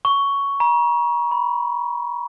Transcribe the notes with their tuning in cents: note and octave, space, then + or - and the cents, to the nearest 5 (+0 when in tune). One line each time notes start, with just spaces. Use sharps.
C#6 +10
A#5 +40
B5 +15